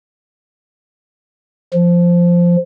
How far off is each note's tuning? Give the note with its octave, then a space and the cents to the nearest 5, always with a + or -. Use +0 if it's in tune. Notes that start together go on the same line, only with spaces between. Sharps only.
F3 -5